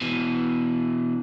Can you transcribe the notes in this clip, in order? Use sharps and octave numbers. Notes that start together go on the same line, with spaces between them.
B2 E3